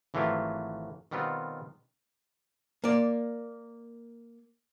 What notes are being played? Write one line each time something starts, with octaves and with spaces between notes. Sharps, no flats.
G#1 E3 F#3 A3 F4 G4
B2 D#3 G3 B3 C4 F4
A#3 D5